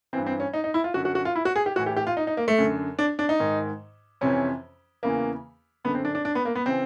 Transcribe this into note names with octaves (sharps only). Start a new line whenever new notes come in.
G2 E3 C4
C4
C#4
D#4
D#4
E4
F4
F#2 D3 F#4
F#4
F#4
F4
E4
F#4
G#4
G4
A2 E3 F#4
G4
G4
F4
D#4
D#4
A#3
A3
F#2 D3
D4
D4
D#4
G#2 D#3
F2 C3 E3 C#4
E2 C#3 E3 A#3
F#2 D3 B3
C4
D4
D4
D4
B3
A#3
B3
C#3 E3 C4